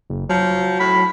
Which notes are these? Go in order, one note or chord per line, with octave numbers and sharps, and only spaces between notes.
F#1
F3 F#3
A2 B5